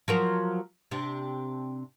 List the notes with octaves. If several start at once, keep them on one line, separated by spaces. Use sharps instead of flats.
F3 F#3 A#4
C3 D4